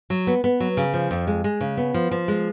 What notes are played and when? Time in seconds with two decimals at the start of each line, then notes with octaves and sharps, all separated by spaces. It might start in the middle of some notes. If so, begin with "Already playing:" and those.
0.10 F#3
0.27 B3
0.44 B3
0.60 F#3
0.77 C#3
0.94 F3
1.11 F2
1.27 G#3
1.44 G#3
1.61 C#3
1.77 B3
1.94 F3
2.11 F3
2.28 G#3